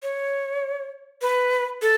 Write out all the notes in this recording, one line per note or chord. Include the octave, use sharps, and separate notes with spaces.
C#5
B4
A4